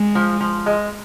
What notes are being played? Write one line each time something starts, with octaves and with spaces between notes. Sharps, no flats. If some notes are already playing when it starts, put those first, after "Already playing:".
Already playing: G#3
F3
F3
G#3